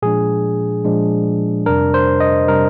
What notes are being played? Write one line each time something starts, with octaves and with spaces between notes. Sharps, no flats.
A#2 F3 G#3 D4 G#4
A#2 F3 G#3 D4
F2 C3 G3 D4 A#4
C5
D#5
C3 G3 D4 A#4